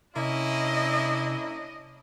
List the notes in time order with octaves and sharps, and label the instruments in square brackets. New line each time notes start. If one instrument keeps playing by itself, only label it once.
[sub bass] C3 [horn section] A#3 C#4 E4 [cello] D4 D#5